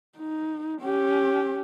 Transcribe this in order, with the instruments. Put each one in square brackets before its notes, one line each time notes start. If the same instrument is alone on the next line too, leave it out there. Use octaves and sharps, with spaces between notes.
[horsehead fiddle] D#4
C#4 G4